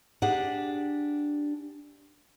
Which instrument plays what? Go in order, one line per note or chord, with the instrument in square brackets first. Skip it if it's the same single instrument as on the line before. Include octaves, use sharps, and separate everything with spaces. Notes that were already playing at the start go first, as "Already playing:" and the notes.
[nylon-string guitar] D4 G4 G#4 F#5